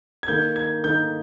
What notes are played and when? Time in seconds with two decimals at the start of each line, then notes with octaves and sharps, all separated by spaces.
0.23 G#6
0.28 D#3 A#3 D#4 G6
0.56 G#6
0.84 D#3 A#3 D#4 G6